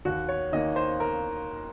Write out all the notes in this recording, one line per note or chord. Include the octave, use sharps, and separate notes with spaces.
D#2 F#4
C#5
D#3 A#3 D#5
C5
A#4